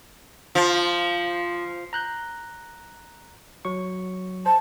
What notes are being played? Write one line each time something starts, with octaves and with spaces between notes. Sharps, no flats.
F3
A#5 F#6 G6
F#3 C#6
C5 A5